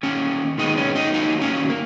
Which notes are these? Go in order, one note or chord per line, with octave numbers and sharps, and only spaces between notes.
D#3 A#3 C#4
D#3 G#3 B3 D#4
C#4
D#4
D#3 F#3 A#3 D#4
C#4
A#3